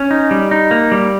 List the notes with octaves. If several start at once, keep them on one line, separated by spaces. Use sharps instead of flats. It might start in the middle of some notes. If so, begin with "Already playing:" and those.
Already playing: C#4
D#4
G3
D#4
A#3
G3